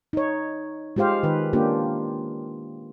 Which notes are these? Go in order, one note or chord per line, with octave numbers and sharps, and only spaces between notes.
D#4 C#5
G#3 F4 G4 C5 F5
D#3 B4
A#3 C#4 D4 F4 G4